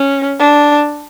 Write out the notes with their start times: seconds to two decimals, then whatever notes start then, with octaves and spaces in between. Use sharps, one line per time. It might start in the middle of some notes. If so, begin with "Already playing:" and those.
Already playing: C#4
0.40 D4